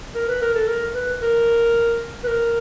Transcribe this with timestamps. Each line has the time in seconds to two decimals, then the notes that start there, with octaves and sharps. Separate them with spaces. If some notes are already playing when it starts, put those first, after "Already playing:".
0.15 A#4
0.28 B4
0.42 A#4
0.55 A4
0.68 A#4
0.95 B4
1.22 A#4
2.24 B4
2.28 A#4